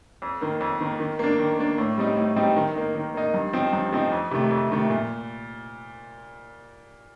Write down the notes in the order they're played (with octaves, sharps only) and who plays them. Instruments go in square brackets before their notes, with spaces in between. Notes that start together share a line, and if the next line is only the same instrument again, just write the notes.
[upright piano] F2
D#3 A#3
F2
D#3 A#3
D#3
A#3 D4
D#3
A#3 D4
A2
G3 C4 D#4
A2
G3 C4 D#4
D#3
A#3 D#4
D#3
A#3 D#4
G2
F3 C4 D#4
G2
F3 C4 D#4
F2
C3 D#3 A3
F2
C3 D#3 A3
A#2